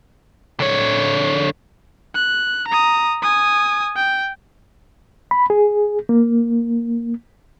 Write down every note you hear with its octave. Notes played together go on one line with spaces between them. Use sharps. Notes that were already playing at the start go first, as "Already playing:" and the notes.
D3 C#5
F#6
A#5 D#6
G#5 D#6
G5
B5
G#4
A#3